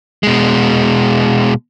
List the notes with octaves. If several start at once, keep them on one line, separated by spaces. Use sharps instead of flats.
B2 G#3